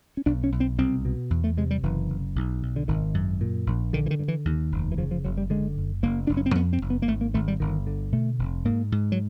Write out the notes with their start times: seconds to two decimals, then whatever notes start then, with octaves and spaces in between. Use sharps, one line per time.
0.17 C#4
0.26 B1 D4
0.44 C#4
0.52 B1
0.60 C4
0.78 C2 C4
1.05 B2
1.30 E2
1.44 A3
1.57 C3 G#3
1.71 G3
1.83 F#1 E3
2.09 F#1
2.36 B1
2.62 B1
2.76 D3
2.88 G#1 D#3
3.14 F#2
3.41 A#2
3.67 A#1
3.93 D3 D#3
4.06 E3
4.11 D#3
4.19 G2
4.28 E3
4.45 D#2
4.72 F1
4.92 E3
4.98 C#3 F3
5.11 F3
5.24 F#1 F#3
5.38 G3
5.50 D3 G#3
5.77 F#1
6.03 F#1 A#3
6.27 F#1 D4
6.37 C#4
6.46 C4
6.55 F2 B3
6.73 C4
6.82 F#1
6.90 B3
7.02 A#3
7.08 G#1 A3
7.21 A#3
7.34 G#1 A3
7.48 G3
7.60 G1 D#3
7.87 D3
8.12 B2 A3
8.39 F1
8.65 G#2 A#3
8.92 G#2
9.12 F#3